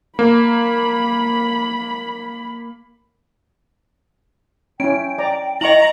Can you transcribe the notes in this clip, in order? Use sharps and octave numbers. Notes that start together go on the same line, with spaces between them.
A#3 B5
C#4 E4 G5 D7
D5 A#5
E4 D#5 A#5 C#6 F#7